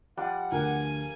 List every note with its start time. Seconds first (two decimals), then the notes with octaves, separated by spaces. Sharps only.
0.17 F3 G3 D4 F#5
0.52 D2 A#4 G#5